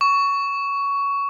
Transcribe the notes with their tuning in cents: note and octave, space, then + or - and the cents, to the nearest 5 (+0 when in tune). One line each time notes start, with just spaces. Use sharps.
C#6 +15